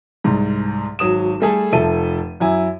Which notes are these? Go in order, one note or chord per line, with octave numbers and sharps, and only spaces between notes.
C2 G#2
G#1 F#3 D#6 E7
G3 A3 G#4 A4
F1 F3 A4 E5 D#7
F#2 E4 G#5